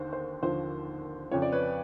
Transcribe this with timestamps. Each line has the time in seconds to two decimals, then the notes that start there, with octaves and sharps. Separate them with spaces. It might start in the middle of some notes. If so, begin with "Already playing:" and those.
Already playing: D#2 D3 C5
0.13 C5
0.43 D#2 D3 F3 C5
1.31 F2 C#3 F3 C#5
1.42 D5
1.52 B4 C#5